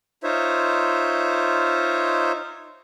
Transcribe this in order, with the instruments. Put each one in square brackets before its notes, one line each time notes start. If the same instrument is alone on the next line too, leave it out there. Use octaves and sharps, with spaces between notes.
[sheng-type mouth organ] D#4 F4 C5 C#5 E5